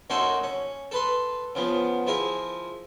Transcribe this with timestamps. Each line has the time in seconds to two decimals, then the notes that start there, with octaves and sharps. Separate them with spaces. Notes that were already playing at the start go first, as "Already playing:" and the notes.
0.10 F#2 A#3 D#4 F#4 A4 C6
0.44 C#4
0.91 A4 B4 C6
1.55 C#3 F3 B3
2.07 F3 E4 G#4 A#4